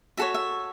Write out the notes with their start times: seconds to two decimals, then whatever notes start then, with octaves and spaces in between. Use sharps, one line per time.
0.17 F#4 A4 C#5 E5
0.34 E5